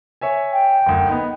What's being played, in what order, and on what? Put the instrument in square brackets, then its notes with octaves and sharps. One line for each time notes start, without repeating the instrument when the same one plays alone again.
[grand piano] C#5 E5 G#5
[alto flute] G5
[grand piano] F#1 D2
B3 D#4